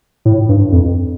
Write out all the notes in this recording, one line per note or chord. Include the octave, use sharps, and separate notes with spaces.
A2
G2
F2